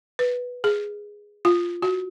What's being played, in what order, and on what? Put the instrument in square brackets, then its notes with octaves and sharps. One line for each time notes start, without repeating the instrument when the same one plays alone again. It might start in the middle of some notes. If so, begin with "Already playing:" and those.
[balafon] B4
G#4
F4
F#4